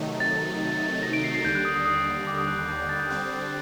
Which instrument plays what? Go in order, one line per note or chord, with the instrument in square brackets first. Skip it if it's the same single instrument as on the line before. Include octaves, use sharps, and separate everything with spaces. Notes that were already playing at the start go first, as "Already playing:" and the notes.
Already playing: [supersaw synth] C3 D#3 F#3 A3 D#4
[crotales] A6
A#6
D7
C7
C7
[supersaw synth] D#2 D3 G3 [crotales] G6
[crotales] F#6
D#6
D#6
D#6
D6
D#6
F#6
F#6
G6
G6
A6
G6
[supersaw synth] D3 G3 C4 [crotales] F#6